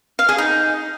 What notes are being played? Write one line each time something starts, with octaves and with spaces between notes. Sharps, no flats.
F5
G#4
D#4